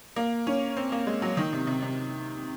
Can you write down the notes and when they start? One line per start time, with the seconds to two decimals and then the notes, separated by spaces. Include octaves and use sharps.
0.16 A#3
0.47 C#4
0.77 C4
0.92 A#3
1.07 G#3
1.22 F#3
1.37 D#3
1.53 C3
1.67 C3
1.82 C3